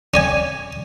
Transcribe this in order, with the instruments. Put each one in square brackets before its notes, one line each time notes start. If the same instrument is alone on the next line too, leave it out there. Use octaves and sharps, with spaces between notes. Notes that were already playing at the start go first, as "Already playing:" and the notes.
[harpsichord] C#4 D5 G#5